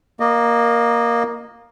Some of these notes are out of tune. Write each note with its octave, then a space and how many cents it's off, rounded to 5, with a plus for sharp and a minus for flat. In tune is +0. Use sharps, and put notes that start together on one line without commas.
A#3 +10 D#5 -20